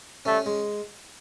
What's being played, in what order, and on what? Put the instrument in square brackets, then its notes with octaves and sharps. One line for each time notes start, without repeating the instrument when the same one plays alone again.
[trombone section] G3 A3 [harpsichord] C#4
[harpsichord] G#3